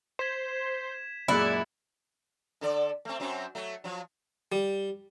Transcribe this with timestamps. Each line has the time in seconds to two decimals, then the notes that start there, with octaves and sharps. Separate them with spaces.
0.19 C5 G#6 B6 E7
1.28 F#2 A#2 G#3 E4 D5 F#6 A6 C#7
2.61 D3 A4 D5
3.05 A3 C4
3.20 F#2 F#3 C4
3.55 F#3 A3
3.84 F3 F#3
4.52 G3